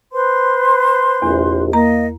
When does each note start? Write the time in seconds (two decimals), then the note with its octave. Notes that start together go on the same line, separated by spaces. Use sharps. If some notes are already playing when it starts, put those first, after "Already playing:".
0.12 B4 C5 C6
1.22 A#1 E2 C3
1.73 A#3 D#5 A#5